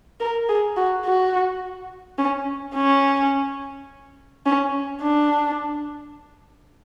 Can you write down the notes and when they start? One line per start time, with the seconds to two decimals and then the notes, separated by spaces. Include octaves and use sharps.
0.20 A#4
0.49 G#4
0.77 F#4
1.05 F#4
2.19 C#4
2.76 C#4
4.46 C#4
5.02 D4